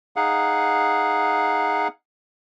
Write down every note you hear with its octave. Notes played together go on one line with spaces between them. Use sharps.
D#4 G#4 F5 F#5